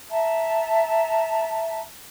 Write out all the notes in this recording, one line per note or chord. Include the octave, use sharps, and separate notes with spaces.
E5 A5 A#5